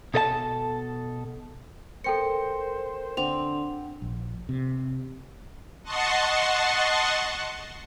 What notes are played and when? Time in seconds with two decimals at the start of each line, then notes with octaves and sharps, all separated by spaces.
0.14 B2 A4 D#5 A5
2.04 A4 A#4 C5 G5 C#7
3.17 D3 C4 D4 F#5 F7
4.02 A#1
4.49 C3
5.83 D#5 F#5 A5 C6 C#6